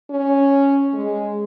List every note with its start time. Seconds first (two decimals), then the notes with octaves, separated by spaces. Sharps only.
0.10 C#4
0.94 G#3